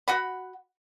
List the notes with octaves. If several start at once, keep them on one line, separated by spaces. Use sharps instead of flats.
F#4 F#5 B5